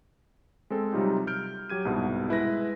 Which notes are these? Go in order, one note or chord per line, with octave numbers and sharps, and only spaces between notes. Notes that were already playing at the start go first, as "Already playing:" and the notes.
G#3 C4 A4
C3 F#3 G3 D#4 F4 G4
F6 G6 D7
F#3 G4 G#6 D#7
C2 G#2 B2 G3
G#3 E4 B4 A#6